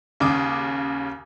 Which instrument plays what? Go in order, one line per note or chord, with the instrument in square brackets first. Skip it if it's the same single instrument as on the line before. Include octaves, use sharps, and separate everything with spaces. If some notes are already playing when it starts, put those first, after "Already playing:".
[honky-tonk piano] D#2 C#3 D6 D#6